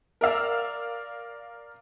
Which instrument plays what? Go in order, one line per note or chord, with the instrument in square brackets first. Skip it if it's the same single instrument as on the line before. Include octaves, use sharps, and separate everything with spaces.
[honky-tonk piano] A#4 D5 F5 E6